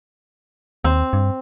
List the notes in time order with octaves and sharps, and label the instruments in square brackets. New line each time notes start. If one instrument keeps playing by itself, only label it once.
[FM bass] D#2 [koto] C4
[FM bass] G2